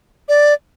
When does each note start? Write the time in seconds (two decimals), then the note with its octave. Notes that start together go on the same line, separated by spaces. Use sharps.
0.29 D5